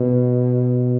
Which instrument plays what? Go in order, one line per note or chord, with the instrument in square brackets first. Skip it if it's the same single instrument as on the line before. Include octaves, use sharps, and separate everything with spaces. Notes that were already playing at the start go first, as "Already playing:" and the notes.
Already playing: [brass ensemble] B2